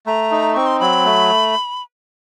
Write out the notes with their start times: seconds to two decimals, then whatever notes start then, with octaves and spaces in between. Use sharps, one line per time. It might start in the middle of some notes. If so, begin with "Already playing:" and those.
0.06 A3 A#5
0.32 D#4
0.54 C4 C#6
0.66 C6
0.80 F#3 B5
1.05 A3